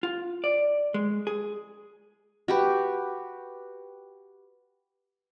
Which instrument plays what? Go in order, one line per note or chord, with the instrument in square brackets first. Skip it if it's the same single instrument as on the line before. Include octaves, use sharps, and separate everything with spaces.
[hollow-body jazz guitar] F4
D5
G#3
G#4
[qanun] F#4 G4 B4